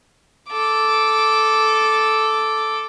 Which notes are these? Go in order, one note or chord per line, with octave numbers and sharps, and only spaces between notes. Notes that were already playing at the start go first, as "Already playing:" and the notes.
A4 D6